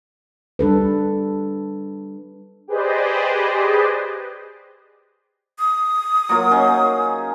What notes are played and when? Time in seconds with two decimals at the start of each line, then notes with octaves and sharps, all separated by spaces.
0.59 G3 D4 A4 B4
2.68 G4 G#4 B4 C5 D5 D#5
5.58 D#6
6.29 F#3 A#3 F4
6.51 C#4 D#4 G#4